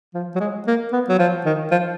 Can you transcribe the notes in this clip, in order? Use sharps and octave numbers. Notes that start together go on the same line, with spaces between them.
F3
F#3
G#3
A#3
B3
F#3
F3
D#3
F3